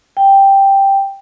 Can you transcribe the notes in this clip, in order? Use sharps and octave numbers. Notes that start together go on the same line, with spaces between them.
G5